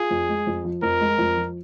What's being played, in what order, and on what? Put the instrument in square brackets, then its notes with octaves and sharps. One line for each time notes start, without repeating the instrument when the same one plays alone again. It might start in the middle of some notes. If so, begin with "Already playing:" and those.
Already playing: [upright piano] F4 [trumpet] G#4
[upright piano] F2
G#3
F2
F3
[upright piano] F2 [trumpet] A#4
[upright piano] G#3
F2
F3